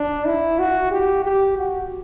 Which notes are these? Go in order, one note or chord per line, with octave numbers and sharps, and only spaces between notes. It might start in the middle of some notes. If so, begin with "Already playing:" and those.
Already playing: D4
E4
F#4
G4
G4
F#4